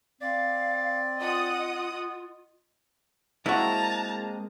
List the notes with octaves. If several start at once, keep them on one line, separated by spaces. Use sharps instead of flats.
C4 D5 F5
F4 D#5 F#5 D#6
G#3 A#3 C4 E4 F#4 A5 A#5